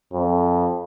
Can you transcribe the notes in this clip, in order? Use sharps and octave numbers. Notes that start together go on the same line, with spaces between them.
F2